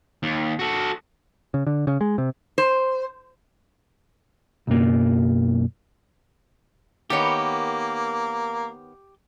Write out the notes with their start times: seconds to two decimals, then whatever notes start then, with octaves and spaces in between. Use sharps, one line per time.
0.23 D#2
0.59 F#4 A4
1.54 C#3
1.67 D3
1.87 C#3
2.01 G#3
2.18 C3
2.58 C5
4.67 B1 F#2 A#3
7.10 D#3 A#3 B3 G4 C#5